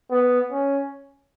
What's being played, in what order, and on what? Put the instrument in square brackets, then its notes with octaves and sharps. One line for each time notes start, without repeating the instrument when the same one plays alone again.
[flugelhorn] B3
C#4